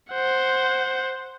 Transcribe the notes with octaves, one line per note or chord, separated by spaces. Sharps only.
C5 F#5